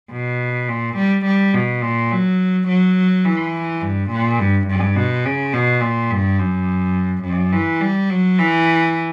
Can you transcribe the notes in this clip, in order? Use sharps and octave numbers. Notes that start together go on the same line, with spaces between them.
B2
A#2
G3
G3
B2
A#2
F#3
F#3
E3
G2
A#2
G2
G2
B2
C#3
B2
A#2
G2
F#2
F#2
E3
G3
F#3
E3